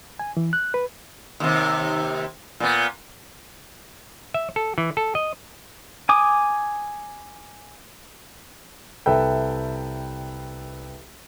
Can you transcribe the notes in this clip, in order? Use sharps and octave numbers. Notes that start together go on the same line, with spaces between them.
G#5
E3
F#6
B4
D#2 C3
A#2 B3
E5
A4
E3
A4
D#5
G#5 D6 D#6
C2 A4 B4 E5 G5